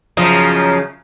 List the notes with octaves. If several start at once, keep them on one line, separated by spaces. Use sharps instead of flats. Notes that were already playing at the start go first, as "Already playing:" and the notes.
F#2 C#3 F3 D#4